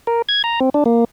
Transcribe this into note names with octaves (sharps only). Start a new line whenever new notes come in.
A#4
G#6
A#5
C4
D4
A#3